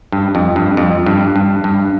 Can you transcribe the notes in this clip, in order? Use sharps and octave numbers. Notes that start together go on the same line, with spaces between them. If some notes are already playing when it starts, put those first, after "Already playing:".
G2
F2
G2
F2
G2
G2
G2